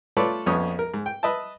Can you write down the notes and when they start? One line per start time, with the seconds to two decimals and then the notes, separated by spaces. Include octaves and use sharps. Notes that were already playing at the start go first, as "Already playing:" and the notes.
0.17 A3 F4 A4 B4 C#5 D5
0.46 A#1 F2 B3 C#4 C#5 D#6
0.79 A#4
0.94 G#2
1.06 G5
1.23 B4 D#5 E5 A5